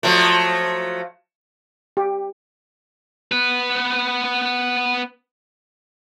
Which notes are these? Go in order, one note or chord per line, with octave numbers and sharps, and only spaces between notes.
F3 F#3 A3
G4
B3 B4